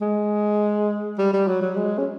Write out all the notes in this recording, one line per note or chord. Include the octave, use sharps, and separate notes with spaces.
G#3
G3
G3
F#3
F#3
G#3
C#4